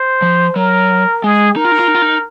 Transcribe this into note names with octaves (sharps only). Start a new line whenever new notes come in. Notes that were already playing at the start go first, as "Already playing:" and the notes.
Already playing: C5
F3
F#3 A#4
G#3 G#4
D#4 A#4
F4
D#4
F4
D#4
F4
D#4